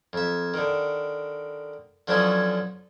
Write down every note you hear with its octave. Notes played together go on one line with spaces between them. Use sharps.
F2 E5
D3 D#3
D3 F3 F#3 B3 C#4 D#4